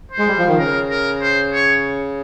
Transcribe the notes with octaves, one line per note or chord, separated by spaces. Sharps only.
C5
G#3
G3
F3
D#3
C#3 A#4
A#4
C5
C#5